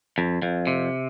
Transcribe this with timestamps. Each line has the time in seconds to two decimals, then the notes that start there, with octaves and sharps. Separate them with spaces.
0.18 F2
0.42 F2
0.67 C3